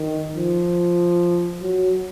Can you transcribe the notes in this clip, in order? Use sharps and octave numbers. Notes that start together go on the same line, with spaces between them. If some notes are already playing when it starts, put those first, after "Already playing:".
Already playing: D#3
F3
F#3